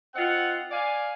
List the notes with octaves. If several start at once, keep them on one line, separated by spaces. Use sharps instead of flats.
C4 D#4 F4 F#5
D5 F5 G#5